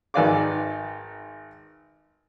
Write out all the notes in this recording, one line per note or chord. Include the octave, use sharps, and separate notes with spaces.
G#1 D#3 B4 D5 F5 D6